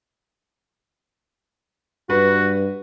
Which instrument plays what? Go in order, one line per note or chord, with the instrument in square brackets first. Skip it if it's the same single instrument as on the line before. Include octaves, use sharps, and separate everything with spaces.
[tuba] G2 [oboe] F#4 [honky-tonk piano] B4